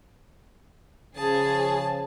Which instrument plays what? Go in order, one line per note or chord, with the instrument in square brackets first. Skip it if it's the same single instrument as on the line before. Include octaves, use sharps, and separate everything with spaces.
[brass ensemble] C#3 F3 [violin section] G#4 [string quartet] A5